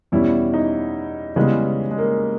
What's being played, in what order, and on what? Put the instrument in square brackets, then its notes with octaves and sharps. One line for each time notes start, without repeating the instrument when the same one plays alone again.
[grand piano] E2 B2 G3 C#4 [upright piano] E4
[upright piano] D#4
[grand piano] C#3 E3 G3 B3 [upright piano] G#3
[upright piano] G#3
A#3